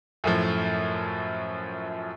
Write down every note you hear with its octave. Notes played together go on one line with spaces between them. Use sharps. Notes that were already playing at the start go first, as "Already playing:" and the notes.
F#2 A2 F3